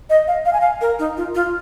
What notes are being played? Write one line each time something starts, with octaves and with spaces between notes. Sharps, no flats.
D#5
F5
F5
G#5
F5
A#4
D#4
F4
F4